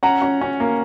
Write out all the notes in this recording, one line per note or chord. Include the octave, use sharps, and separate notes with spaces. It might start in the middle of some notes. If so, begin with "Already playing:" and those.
C#4 F#5 A#5
C#4
C#4
A#3